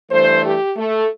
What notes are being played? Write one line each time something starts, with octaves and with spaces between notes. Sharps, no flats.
G2 E3 A3 C5
G4
A3